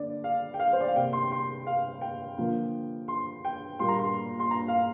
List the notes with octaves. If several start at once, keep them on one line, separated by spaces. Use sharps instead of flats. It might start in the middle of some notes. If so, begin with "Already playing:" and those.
Already playing: D3 A#3 D5
F5
G5
F5
C5
D5
F5
C3 A#3 G5
C6
C6
F5
G5
D3 F3 A#3
C6
G5
A#2 G3 A#3 C6
A#5
C6
C6
A#5
F5